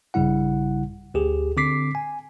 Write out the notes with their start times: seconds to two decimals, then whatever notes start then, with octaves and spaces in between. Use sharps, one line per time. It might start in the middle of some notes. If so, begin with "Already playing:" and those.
0.14 A#1 G2 C#3 G3 E4 F#5
1.14 D2 G4 G#4
1.57 D3 C4 D6 B6 C7
1.95 G#5